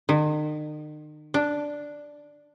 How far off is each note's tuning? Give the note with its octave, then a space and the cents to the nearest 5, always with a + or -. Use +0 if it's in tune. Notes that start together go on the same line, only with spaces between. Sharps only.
D#3 -40
D4 +0